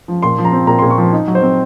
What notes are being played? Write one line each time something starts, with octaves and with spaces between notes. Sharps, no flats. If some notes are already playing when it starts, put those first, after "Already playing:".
F3
A#2 C6
F3
A#5
C4
A#2 A#5
C6
A#2
C#6
F3
D#4
F#3
C5
C4